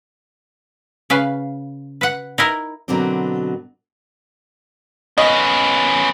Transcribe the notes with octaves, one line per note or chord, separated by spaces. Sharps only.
C#3 B4 F5
B4 F#5
D#4 E4 A#4
B2 D3 F#3 A#3 C4
B3 C#4 D#5